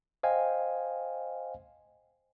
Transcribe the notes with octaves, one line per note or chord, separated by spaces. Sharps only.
C5 D#5 F5 G5 G#5